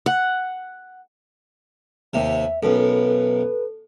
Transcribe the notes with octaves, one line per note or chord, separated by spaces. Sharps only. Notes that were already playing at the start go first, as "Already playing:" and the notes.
F#5
D#2 C3 E5
B1 F#2 A4 B4